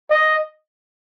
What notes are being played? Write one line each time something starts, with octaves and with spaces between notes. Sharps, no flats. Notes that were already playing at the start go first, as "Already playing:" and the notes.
D#5